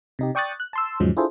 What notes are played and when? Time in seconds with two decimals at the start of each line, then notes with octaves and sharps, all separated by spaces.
0.19 C3 D#4 G4
0.35 D5 G5 C#6 D#6 F#6 A6
0.60 F#6
0.73 A5 C6 E6
1.00 E2 G#2 C#3 F3 F#3 G#3
1.17 D4 E4 F4 G#4 A4 C5